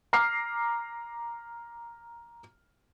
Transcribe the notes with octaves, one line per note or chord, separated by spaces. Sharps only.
A#5 D6 F6 C7